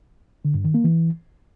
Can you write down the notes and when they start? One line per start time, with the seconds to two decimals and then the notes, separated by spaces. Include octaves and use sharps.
0.45 D3
0.55 G2
0.64 D#3
0.74 A#3
0.84 E3